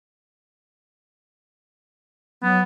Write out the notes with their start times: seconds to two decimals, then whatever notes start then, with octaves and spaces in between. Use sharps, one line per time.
2.43 F#3 B3